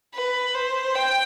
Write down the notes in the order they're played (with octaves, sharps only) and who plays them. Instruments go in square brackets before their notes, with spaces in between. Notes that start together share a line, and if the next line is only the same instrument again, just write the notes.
[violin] B4
C5
G5